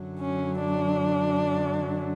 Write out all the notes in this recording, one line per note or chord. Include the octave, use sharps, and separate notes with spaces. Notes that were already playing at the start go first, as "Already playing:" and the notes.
Already playing: F#2 D3 F#3
C#4
D4